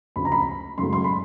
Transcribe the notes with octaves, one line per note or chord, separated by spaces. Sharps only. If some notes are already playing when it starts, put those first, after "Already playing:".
D2 C#3 F3 B5
A#5
B5
F#2 C#3 F#3 A3 C6
C6
B5